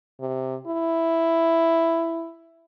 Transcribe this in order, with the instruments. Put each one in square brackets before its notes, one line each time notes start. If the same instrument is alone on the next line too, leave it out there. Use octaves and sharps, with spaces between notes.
[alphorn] C3
E4